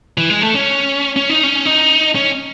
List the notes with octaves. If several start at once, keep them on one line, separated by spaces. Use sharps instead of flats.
E3
G#3
A3
C#4
C#4
D#4
C#4
D#4
C#4